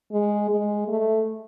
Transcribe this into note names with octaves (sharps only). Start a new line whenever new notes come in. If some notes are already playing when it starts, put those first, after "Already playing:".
G#3
G#3
A3